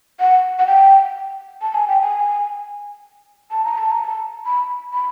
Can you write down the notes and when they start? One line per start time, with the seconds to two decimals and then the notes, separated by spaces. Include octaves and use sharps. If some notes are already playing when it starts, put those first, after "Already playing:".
0.20 F#5
0.59 F#5
0.67 G5
1.62 A5
1.74 G#5
1.88 G5
2.01 G#5
3.51 A5
3.64 A#5
3.78 A5
3.91 A#5
4.05 A5
4.46 B5
4.93 B5